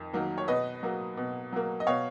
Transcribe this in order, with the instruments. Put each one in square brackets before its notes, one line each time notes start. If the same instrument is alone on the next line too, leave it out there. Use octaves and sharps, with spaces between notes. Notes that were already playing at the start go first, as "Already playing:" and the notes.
Already playing: [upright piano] F2 D#3
D#3 F#3 A#3
C#5
B2 B4 D#5
F#3 A#3
B2
F#3 A#3
D#5
B2 C#5 F5